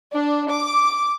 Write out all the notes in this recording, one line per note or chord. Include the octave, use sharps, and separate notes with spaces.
D4
D6